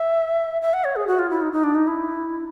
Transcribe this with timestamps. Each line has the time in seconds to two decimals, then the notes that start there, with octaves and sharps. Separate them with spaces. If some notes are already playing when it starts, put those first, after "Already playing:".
Already playing: E5
0.62 E5
0.73 F#5
0.84 C#5
0.96 G#4
1.07 F#4
1.19 F4
1.30 E4
1.42 D#4
1.53 D#4
1.64 D4
1.75 D#4
1.87 E4